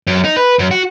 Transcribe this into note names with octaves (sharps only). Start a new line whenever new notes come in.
F#2
D#4
B4
F#2
F#4